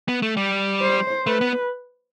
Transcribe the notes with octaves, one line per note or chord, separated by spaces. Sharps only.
B3
A3
G3
C5
A3 B4
B3